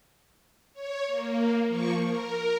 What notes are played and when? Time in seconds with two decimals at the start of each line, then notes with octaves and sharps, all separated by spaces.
0.74 C#5
1.08 A#3
1.67 F3 A#3 C#6
2.04 A#4